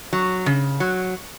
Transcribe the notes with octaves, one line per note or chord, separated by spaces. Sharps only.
F#3
C#3
F#3